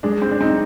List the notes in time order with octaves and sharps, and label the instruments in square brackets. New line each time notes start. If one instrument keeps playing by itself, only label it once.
[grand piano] G#3 [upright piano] D4
[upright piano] C4
D4
[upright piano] C4 [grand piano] D#4